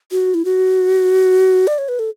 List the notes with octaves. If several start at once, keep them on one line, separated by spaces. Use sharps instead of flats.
F#4
E4
F#4
D5
C#5
B4
A4